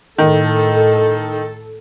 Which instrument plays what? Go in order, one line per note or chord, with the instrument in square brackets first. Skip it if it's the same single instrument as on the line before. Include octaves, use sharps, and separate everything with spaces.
[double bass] A2 [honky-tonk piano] D#3 [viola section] A4